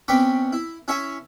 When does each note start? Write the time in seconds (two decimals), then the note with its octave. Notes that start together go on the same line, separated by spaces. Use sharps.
0.08 B2 C4 C#4 B5 C#6 D6
0.53 E4
0.88 C#4 E4 C#5 E5 G#5